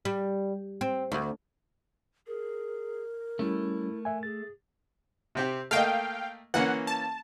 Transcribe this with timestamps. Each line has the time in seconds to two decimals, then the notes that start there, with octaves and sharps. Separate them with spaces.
0.05 G3
0.81 C4
1.12 D2
2.27 G#4 A#4
3.39 G3 A3 C#4 E4
4.05 E5 G#5
4.23 G#4 A6
5.35 C3 C4 G4
5.71 A3 A#3 D#5 F5 G5
6.54 E3 A#3 C#4 F#5
6.87 A5